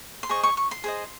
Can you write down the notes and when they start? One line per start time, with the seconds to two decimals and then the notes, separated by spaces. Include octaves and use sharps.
0.23 C6
0.29 G#4 C5 D#5 C#6
0.43 C#6
0.57 C#6
0.71 C6
0.84 G#4 C5 D#5